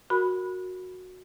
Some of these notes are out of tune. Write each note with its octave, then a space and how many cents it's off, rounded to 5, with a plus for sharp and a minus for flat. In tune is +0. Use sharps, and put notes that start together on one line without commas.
F#4 -10 A#4 -5 B5 +0